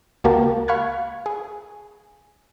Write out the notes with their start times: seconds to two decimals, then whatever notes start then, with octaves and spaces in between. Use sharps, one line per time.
0.24 C#2 A#3 F#4 G4 A#4 A5
0.68 F5 B5 C#6 F6 F#6 G#6
1.26 G#4